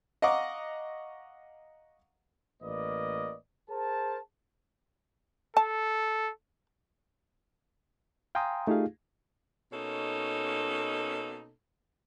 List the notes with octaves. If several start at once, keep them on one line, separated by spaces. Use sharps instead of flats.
D#5 F5 F#5 A#5 C#6 D6
A1 A#3 B4 D5 D#5
G#4 A#4 C5 A5
A4 A5
F5 G5 G#5 A#5 C6 D#6
A3 D#4 F4 G4 G#4 F5
B2 A#3 C#4 D#4 A4